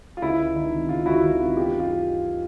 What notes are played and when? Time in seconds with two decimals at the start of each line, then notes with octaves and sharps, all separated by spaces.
0.17 F4
0.22 C#2 E4
0.38 C#2
0.56 D#3
0.73 C3
0.89 C#2 F4
1.06 C#2 E4 F#4
1.24 D#3
1.40 C3 F4
1.56 B3 F4 G4
1.74 F#2
1.79 F4 G4